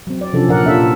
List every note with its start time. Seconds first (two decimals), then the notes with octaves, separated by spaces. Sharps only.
0.07 F#3 C4
0.21 D5
0.33 C3 F3 C#4 D4 A4
0.49 A#2 F3 A#4 D5 F#5
0.66 D4 F4 A4 E5
0.78 A#2